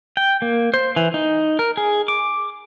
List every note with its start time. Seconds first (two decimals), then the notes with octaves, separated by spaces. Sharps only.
0.17 G5
0.42 A#3
0.74 C5
0.96 E3
1.14 D#4
1.59 A#4
1.77 G#4
2.08 D6